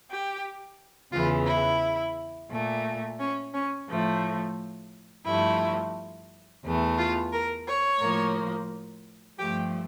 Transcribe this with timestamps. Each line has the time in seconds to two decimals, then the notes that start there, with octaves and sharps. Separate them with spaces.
0.09 G4
1.12 E2 C#3 E3 F4
1.47 E4
2.50 A#2 A3
3.19 C#4
3.54 C#4
3.88 A2 F3 A3
5.25 G2 F3 A3 E4
6.63 E2 E3 A3
6.97 F4
7.32 A#4
7.67 C#5
8.00 A2 F3 A#3
9.38 G2 F3 A3 G4